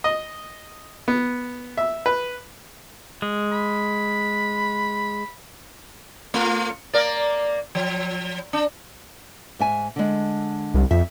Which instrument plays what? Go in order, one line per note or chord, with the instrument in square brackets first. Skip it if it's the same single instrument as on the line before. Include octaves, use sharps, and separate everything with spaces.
[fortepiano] D#5
B3
E5
B4
[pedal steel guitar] G#3
[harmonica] B5
[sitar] A3 F4
A#3 A#4 D5
F3
D4
[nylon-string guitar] G#2 E5 G#5
D3 G#3
[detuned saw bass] C2
[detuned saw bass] F2 [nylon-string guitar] E5